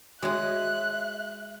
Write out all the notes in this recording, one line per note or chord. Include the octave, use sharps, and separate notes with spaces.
G#3 F#4 G#4 C#5 E5 F#6